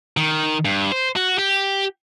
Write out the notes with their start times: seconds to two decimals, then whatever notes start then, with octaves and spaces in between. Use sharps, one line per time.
0.17 D#3
0.65 G2
0.92 C5
1.16 F#4
1.38 G4